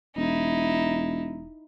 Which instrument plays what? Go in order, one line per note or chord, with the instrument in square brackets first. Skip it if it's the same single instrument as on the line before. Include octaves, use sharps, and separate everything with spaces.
[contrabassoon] E1 [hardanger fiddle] D#4 E4